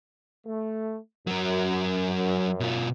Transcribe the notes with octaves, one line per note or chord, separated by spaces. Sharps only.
A3
F#2 F#3 A#4
B2 F4